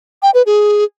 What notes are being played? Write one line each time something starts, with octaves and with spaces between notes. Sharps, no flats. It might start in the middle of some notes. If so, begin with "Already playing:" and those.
G5
B4
G#4